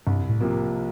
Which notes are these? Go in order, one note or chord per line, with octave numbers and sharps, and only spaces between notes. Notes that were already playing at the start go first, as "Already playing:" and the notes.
C2 G2
A2
C3 F3 A#3